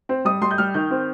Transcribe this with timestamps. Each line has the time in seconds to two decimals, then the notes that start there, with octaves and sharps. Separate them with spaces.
0.09 C4
0.25 G3 D#6
0.41 G3 C6
0.51 G6
0.58 G3 F6
0.74 D#3 G6
0.91 C4